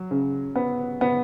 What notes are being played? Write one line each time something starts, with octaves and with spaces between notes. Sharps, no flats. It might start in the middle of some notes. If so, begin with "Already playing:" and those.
Already playing: F#3
C#3
B3
B3